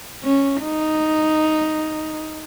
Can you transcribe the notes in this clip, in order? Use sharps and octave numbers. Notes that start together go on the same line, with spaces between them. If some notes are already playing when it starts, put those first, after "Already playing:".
C#4
D#4